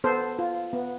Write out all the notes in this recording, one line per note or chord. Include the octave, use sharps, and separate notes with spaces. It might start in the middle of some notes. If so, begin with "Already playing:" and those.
B3 A4 C5
F4
B3